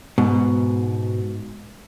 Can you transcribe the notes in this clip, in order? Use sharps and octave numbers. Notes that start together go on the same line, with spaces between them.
G#2 B2